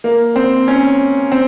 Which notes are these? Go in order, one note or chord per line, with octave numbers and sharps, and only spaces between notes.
A#3
C4
C#4
C4